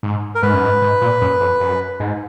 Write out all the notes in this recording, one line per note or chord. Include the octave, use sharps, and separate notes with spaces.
G#2
A#4
G#2 B4
F#2
G#2
G#2
A#2
F#2
F2
F#2
G#2